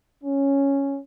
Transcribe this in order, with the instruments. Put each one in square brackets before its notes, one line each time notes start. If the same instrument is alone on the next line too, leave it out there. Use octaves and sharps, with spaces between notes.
[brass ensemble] C#4